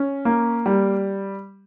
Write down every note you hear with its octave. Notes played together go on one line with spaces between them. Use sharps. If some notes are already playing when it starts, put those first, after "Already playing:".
Already playing: C#4
A#3
G3